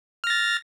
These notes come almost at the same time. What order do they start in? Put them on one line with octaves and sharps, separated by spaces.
F6 A#6 A6